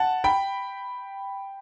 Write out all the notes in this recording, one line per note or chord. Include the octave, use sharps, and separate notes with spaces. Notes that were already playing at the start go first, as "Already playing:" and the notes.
Already playing: F#5 A5
G5 B5